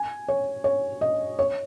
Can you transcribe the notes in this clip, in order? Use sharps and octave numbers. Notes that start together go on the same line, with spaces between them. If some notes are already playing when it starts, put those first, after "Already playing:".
Already playing: G#5
C#5
C#5
D#5
C#5